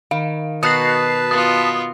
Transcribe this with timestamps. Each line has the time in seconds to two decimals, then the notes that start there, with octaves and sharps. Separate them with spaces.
0.11 D#3 F5
0.63 B2 D#4 F#4 B4 A5 D#6 F#6 C7
1.31 B3 F4 D#6